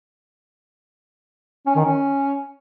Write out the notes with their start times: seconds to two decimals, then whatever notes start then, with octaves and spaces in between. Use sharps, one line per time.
1.67 C#4
1.76 D#3
1.85 C#4